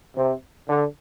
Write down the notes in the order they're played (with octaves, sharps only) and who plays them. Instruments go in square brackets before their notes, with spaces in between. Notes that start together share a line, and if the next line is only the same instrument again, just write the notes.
[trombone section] C3
D3